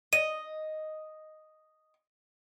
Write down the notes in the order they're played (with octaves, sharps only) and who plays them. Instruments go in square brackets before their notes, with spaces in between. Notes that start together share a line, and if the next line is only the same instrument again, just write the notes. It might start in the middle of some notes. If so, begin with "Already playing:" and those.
[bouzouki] D#5 [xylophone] D#7